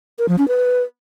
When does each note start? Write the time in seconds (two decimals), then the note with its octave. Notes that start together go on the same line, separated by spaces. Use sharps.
0.19 A#4
0.29 F3
0.38 C#4
0.48 B4